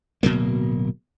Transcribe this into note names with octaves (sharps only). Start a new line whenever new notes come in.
D1 B2 F#3 A#3